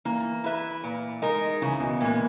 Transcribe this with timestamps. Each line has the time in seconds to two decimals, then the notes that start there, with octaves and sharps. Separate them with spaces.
0.05 E3 A#3
0.44 E4 B4 E5
0.84 A#2
1.22 G#3 D#4 A#4
1.62 C#3 E3
1.80 B2
2.00 A#2 E3 G#3